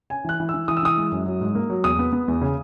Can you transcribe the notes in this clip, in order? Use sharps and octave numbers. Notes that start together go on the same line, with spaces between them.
C#4 G#5
E3 F#6
E3
E6
E3
E3 D#6
E6
E3 D#6
G#3
F#2
F#3
G#2
A#3
F#3
E2 D#6
B3
B3
E2
C#3